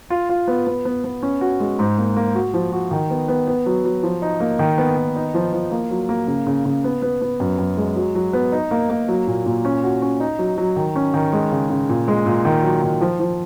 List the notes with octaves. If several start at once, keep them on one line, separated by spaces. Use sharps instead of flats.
F4
F4
B3
B3
B3
B3
C#4
F#4
G#3
G#2
A#3
A#3
F#4
F3
F#4
D#3
B3
B3
B3
F#3
F#3
F3
D#4
A#3
D#3
B3
D#3
D#4
F3
F3
A#3
F#3
A#3
C#3
C#3
C#3
B3
B3
B3
F#2
F#2
G#3
F#3
F#3
B3
D#4
A#3
A#3
F#3
A#2
A#2
C#4
F#4
C#4
D#4
F#3
F#3
D#3
C#4
D#3
G#3
C#3
C#3
A#2
G#3
A#2
D#3
F#3
D#3
F3
F3